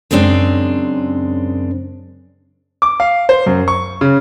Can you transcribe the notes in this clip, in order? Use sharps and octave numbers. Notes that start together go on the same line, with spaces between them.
F#2 C#3 G#3 C4 D4
D6
F5
C5
F#2
C#6
C#3